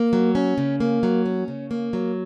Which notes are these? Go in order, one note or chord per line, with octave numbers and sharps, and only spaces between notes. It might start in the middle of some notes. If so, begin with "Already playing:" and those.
Already playing: A#3
F#3
C#4
C#3
A#3
F#3
C#4
C#3
A#3
F#3